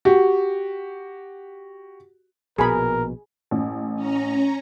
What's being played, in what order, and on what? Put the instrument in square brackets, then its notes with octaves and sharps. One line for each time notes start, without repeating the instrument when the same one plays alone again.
[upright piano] F#4 G4
[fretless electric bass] A#1 B2 [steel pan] G#4 G#5 B5 [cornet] A#4
[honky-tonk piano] A1
[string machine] C#4 A#5